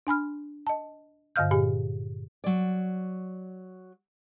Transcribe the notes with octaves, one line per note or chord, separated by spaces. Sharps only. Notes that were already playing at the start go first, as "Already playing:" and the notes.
D4 G#5 B5 F6
D#5 A5
G2 D3 D#5 F5 F6 G6
A#2 G4 G#5
F#3 D5